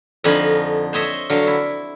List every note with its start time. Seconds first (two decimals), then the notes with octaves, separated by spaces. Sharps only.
0.24 F2 D3 D#4 F5 G#5 B5
0.93 C5 C#5 D#5 E5
1.30 D3 F#3 F5
1.47 E4